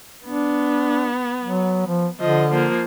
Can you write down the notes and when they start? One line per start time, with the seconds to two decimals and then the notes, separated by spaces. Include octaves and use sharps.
0.25 B3 D4
1.43 F#3
1.87 F3
2.20 D3 F3 D#5
2.51 F3 A#3